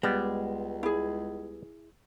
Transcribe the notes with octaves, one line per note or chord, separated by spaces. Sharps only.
C#2 G3 G#3 B3
E4 G#4